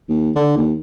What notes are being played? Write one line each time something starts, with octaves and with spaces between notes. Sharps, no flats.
D#2
D3
D#2